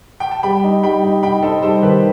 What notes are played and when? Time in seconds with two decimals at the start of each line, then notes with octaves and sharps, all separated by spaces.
0.20 G5
0.31 A5
0.43 G3 G5 B5
0.64 D#4
0.83 G3 G5 B5
1.03 D#4
1.23 D#4 G5 B5
1.42 D#4 A4 C5
1.63 G3 A4 C5
1.82 D#3 G4 B4